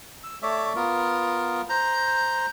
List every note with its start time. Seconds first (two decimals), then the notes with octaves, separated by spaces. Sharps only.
0.24 E6
0.42 A3 C#5 D5 E5
0.76 B3 F4 A#4
1.69 C5 A#5